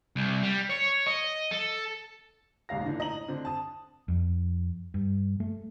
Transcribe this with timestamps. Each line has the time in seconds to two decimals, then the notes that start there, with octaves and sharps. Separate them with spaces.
0.16 C2
0.43 G3
0.70 C#5
1.07 D#5
1.52 A4
2.69 D#1 A1 G#2 F5 A#6
2.86 D3 E3 D4 D#4
2.99 A2 D#5 A#5 F#7
3.28 D3 C4 D4
3.45 A5 D#6
4.08 F2
4.94 G2
5.40 A3